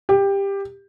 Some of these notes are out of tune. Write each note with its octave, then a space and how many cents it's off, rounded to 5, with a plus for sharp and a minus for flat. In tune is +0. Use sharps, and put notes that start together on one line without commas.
G4 +15